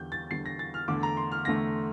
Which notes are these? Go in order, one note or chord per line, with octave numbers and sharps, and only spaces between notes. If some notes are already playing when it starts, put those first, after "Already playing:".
Already playing: E2 D3 G3 G6
A6
E2 D3 G3 C7
A#6
A6
F6
E2 D3 A3 D6
A#5
C6
F6
E2 D3 A3 A#6